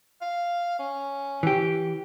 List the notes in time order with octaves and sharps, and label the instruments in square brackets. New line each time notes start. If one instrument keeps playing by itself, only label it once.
[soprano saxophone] F5
C#4
[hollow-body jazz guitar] E3 G4